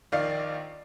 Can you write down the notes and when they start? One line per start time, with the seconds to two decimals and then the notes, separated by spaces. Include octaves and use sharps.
0.12 A#1 D#3 D5 F5 C7